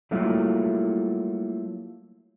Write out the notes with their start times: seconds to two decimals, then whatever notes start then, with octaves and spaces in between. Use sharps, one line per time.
0.11 F#3 G3 A3 A#3 E4 F4